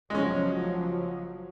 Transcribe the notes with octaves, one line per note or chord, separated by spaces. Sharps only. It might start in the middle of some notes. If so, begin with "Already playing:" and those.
F#1 F3 F#3 G#3 C#4